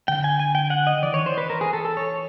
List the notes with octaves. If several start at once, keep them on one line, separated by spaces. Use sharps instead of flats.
D3 G5
G#5
G#5
G5
F#5
D#5
E3 D5
D#3 C#5
E3 C5
B4
A#4
G#4
A4
A4
C#5